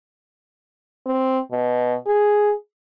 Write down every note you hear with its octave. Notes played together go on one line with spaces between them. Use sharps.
C4
B2
G#4